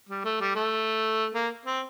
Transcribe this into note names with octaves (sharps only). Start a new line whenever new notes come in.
G3
A3
G3
A3
A#3
C4